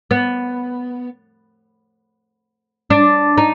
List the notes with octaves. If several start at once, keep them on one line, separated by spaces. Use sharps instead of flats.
B3
D4
D#4